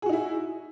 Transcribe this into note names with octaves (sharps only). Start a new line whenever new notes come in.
D#4 E4 F#4 G#4